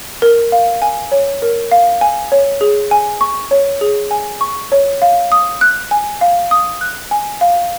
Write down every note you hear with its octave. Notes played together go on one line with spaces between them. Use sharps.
A#4
F5
G#5
C#5
A#4
F5
G#5
C#5
G#4
G#5
C#6
C#5
G#4
G#5
C#6
C#5
F5
D#6
F#6
G#5
F5
D#6
F#6
G#5
F5